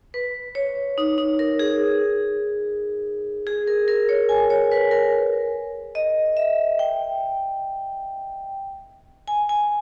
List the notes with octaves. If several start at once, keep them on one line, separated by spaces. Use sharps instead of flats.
B4
C#5
D#4
D#4
A#4
G#4
G#4
A#4
A#4
C#5
G#5
C#5
B4
A#4
D#5
E5
G5
G#5
G#5